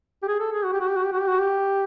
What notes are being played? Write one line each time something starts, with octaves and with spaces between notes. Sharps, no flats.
G4
G#4
A4
G#4
F#4
G4
F#4
G4
F#4
G4
F#4
G4
F#4
G4